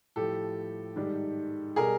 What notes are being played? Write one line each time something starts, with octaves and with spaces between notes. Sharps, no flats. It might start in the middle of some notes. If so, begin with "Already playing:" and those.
A2 F3 G4 A4
G#2 D#3 G3
B2 G3 G#4 A#4